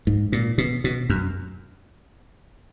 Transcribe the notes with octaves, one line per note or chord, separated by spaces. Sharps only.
G#2
A#2
B2
B2
F#2